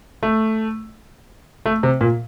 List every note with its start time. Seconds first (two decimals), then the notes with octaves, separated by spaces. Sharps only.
0.23 A3
1.66 A3
1.83 C3
2.01 A#2